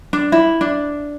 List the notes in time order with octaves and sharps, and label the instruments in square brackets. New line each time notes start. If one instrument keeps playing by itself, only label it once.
[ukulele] D4
E4
D4